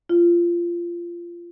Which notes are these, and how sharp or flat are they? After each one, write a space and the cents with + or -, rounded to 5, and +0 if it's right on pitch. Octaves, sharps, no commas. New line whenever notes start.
F4 -20